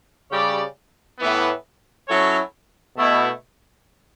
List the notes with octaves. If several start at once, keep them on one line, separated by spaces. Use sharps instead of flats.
C#3 G3 C#4 G4 D5
A2 E3 B3
F#3 C#4 E4 A4 C#5
B2 A3 E4